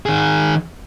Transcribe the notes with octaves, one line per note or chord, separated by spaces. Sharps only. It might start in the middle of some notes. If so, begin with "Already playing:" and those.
D#3 G#4